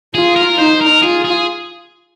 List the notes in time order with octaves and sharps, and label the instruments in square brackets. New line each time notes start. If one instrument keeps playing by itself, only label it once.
[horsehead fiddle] F4 [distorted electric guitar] G#4
[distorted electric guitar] A#4
[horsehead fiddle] D#4 [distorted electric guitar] C5
[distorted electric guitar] A#4
[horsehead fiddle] F4 [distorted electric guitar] G#4
[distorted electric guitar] G#4